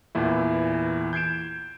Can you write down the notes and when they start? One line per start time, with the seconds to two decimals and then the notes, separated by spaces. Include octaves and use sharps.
0.15 E2 A#2 E3 E4
1.13 G6 G#6 C7 D7 E7